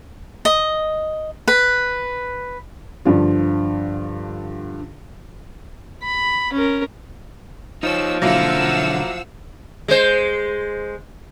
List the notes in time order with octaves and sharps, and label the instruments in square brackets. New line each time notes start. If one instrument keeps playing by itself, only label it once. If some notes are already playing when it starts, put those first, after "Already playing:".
[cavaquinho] D#5
B4
[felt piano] G2 D3 F3 F4
[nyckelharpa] B5
C#4 A#4
[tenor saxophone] F3 [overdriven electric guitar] D#4 C#5 [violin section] E6
[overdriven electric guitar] B1 D3 [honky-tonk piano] F#3 A#3 E4 [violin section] F5 F#5 E6
[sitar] G#3 C5